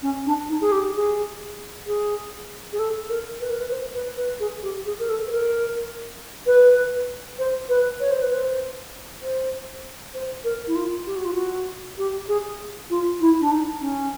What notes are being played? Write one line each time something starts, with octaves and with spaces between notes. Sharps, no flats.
C#4
D4
D#4
G#4
G4
G#4
G#4
G#4
A4
A#4
B4
A#4
B4
C5
B4
B4
G#4
G4
G#4
A#4
A4
B4
A#4
B4
C5
B4
C#5
C5
B4
C5
C5
C5
A#4
E4
F4
G4
F#4
F4
F#4
G4
G#4
F4
E4
D4
D#4
C#4